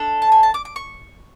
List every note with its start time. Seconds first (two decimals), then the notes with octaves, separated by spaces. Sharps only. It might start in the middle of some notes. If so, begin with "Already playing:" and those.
Already playing: D4 A4
0.22 A5
0.32 G#5
0.43 A5
0.54 D6
0.65 D6
0.76 C#6